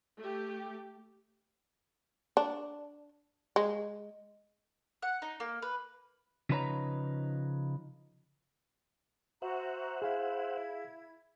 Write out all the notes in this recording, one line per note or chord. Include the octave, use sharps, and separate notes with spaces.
A3 G4
D4
G#3
F#5
D#4
A#3
B4
C#3 F3 D#4 B4 C#5 A#5
F#4 C5 E5 F#5 A#5
E4 G#4 F5 G#6